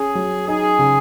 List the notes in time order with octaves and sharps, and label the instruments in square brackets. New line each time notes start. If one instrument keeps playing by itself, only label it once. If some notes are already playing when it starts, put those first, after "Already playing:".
Already playing: [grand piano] C#4 [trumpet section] G#4
[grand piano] F#3
[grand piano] D#4 [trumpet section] G#4
[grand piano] C#3